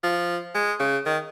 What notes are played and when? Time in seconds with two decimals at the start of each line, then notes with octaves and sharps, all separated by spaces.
0.04 F3
0.55 G#3
0.80 C#3
1.06 D#3